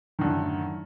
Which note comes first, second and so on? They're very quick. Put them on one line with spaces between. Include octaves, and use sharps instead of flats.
D#3 D3 F#2 A2